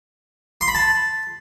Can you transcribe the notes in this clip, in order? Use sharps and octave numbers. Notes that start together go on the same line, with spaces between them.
C6
B5
A5